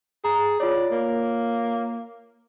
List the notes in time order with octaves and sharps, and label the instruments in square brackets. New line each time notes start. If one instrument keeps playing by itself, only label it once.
[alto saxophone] G#4 [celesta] A#5
[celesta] F4 C#5 [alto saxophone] D5
[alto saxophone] A#3